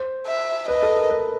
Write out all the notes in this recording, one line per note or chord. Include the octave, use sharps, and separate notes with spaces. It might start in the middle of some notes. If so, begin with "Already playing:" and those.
Already playing: C5
E5
B4 D#5
A4
A#4
B4